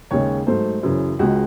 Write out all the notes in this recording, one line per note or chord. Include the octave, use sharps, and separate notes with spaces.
D#2 C#3 G#3 C#5
G#2 F#3 A3 C5
F#2 C#3 E3
C#2 C#3 G#3 F#4